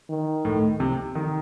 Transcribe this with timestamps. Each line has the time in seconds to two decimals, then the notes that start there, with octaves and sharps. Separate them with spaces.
0.10 D#3
0.45 A2
0.80 C3
1.15 D#3